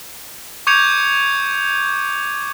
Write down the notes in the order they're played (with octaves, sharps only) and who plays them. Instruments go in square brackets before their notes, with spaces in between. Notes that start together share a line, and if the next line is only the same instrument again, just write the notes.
[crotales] C#6 D6 G6 G#6 C#7 F7